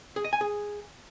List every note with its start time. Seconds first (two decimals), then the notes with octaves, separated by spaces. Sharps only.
0.16 G#4
0.24 D#5
0.33 G#5
0.41 G#4